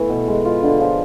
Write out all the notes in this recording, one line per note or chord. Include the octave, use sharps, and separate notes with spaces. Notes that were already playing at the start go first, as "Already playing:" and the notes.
Already playing: E3 A3 B3
B2
G#3
F4
D3
F3